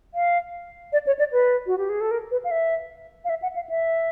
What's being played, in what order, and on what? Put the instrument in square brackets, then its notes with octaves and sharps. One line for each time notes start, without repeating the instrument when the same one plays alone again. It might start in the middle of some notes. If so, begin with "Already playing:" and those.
[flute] F5
D5
C#5
D5
B4
F#4
G4
G#4
A4
A#4
B4
F5
E5
F5
E5
F#5
F5
E5